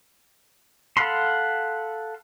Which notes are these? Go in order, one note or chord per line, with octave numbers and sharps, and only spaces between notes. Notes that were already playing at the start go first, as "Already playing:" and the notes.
A4 F5 F#5 B5 C6